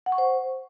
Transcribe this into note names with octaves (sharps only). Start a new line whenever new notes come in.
F#5
C#6
C5